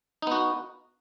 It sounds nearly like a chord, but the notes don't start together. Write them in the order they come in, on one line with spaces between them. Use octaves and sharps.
D#4 B3 F#4